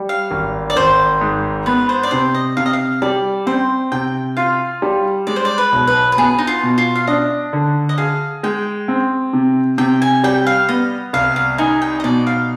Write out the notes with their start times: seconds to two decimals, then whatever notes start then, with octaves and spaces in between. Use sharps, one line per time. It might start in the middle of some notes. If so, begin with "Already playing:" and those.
Already playing: G3
0.09 F5
0.31 G#1
0.70 D5
0.76 G#1 C5
1.21 G#2
1.66 B3 B4
1.89 C5
2.03 D5
2.11 C3 C5
2.34 D#5
2.57 C3 F5
2.66 D#5
2.73 F5
3.02 G3 D5
3.47 C4 C5
3.92 C3 G5
4.37 F4 F5
4.82 G3
5.27 G#3 D5
5.36 C5
5.45 D5
5.58 B4
5.72 B1
5.87 B4
6.12 B4
6.18 B3 G#4
6.39 D#4
6.47 F4
6.63 B2
6.78 F4
6.95 F5
7.07 D4 D#5
7.53 D3
7.89 D#5
7.98 G#4 F5
8.43 G#3 G5
8.88 C4
9.33 C3
9.78 C3 G5
10.02 G#5
10.24 G3 G5
10.47 F5
10.69 B3 D#5
11.13 C2 F5
11.36 F5
11.58 D#4 G#5
11.82 G5
12.00 D#5
12.04 B2 D5
12.27 F5